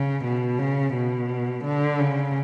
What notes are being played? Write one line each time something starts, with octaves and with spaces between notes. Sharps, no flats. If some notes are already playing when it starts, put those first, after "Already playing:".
Already playing: C#3
B2
C#3
B2
D3
C#3